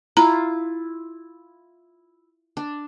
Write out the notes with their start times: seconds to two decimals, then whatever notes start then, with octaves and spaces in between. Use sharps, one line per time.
0.17 E4 F4 A#5
2.57 D4